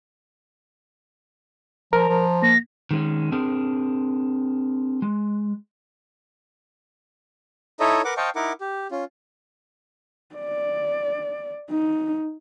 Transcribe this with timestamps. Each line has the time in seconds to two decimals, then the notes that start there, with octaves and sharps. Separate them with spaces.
1.93 F3 A#4 A#5
2.08 F3
2.42 A#3 A#6
2.91 D#3 G#3 A#3 C#4
3.32 C4 D4 G#4 A#4
5.02 G#3
7.80 D#4 E4 A4 C#5 D#5 E5
8.05 A#4 B4 F#5 D6
8.17 C5 D#5 F5 G5 A5 C#6
8.36 D#4 E4 A#4 F#5 D6
8.61 G4
8.91 C#4 F4
10.36 D5
11.70 D#4